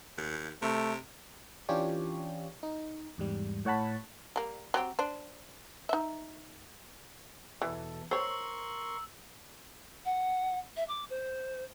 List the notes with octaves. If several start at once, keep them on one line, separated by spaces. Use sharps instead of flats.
D#2
C3 A3
E3 C#4 D4 F4 G4 C#5
D#4
E2 G#2 G3
A2 C#5 F#5 A5 B5
G3 A#3
F#3 C4 G4
D4 C5
D#4 E5
E2 B2 E3 A4
A#4 C5 C#5 C6 C#6 E6
F#5
E5
D6
C5